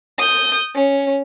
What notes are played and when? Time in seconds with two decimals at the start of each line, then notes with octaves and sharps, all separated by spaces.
0.18 D#6 G6
0.75 C#4